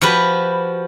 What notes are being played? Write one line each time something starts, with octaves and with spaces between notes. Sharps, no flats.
F3 F#4 G4 B4